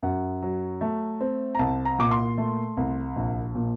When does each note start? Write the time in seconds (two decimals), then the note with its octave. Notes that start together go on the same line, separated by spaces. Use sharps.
0.02 F#2 F#5
0.42 F#3
0.81 A3
1.21 C4
1.55 A#5
1.59 C2 A5
1.85 A#5
1.99 A#2 D6
2.11 C6
2.38 A3
2.77 C2
3.16 A#1
3.55 A#2